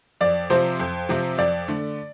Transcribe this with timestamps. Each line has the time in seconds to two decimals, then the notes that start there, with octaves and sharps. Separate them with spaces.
0.21 F2 D5
0.50 C3 F3 C4 C5
0.80 F2
1.09 C3 F3 C4
1.38 F2 D5
1.68 D3 A3